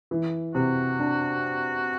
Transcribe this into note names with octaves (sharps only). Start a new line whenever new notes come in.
E3
C3 F#4
D4